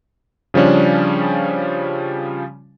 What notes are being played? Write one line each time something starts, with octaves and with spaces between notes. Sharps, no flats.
C#3 F3 G3 C#4 D4